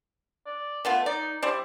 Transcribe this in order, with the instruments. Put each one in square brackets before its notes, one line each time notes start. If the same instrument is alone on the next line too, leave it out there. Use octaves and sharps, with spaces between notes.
[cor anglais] D5
[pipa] A3 B3 F4
[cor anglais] D#4 [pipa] D5
[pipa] G3 C5 D5 [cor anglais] E4